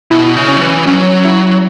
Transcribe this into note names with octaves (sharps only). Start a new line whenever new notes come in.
B2 E4
C#3
C#4
F#3
E3
F#3 C#4
E4